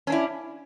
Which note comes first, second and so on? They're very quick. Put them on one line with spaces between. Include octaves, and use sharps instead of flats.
C#4 D4 E4